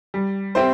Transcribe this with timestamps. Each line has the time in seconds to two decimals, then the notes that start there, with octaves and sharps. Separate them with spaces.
0.14 G3
0.55 C4 E4 G4 C5